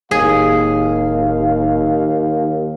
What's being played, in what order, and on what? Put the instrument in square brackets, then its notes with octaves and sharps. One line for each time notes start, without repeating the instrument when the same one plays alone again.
[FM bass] D1 [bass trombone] D#2 [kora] G#4 [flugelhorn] F5